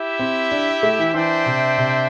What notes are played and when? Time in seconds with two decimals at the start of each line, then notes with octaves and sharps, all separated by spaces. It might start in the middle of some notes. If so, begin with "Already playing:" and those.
Already playing: E4 G4 E5
0.19 C4
0.52 D4
0.83 A3
0.99 E3
1.14 E3 D4 C5 E5 G5
1.46 C3
1.78 C3